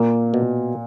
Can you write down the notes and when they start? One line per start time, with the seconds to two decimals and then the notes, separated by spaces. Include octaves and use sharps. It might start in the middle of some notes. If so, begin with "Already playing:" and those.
Already playing: A#2 A#3
0.34 B2